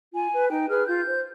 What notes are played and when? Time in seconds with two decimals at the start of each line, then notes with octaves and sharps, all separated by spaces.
0.13 F4 G#5
0.32 B4
0.50 D#4 G5
0.69 G#4 B4 F6
0.87 F4 G6
1.06 C5